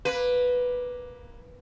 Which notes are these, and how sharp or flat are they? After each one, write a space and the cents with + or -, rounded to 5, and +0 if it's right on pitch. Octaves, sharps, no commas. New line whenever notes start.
A#3 +15 B4 +0